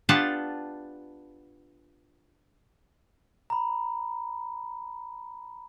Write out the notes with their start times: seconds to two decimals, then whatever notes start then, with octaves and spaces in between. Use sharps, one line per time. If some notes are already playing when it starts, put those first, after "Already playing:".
0.09 B3 D4 F4 G4 F#5 A5
3.50 A#5 B5